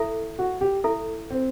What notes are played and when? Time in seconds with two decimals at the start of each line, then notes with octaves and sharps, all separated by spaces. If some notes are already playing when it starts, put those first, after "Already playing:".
Already playing: E4 A4 E5
0.39 F#4
0.61 G4
0.84 E4 A4 E5
1.30 C4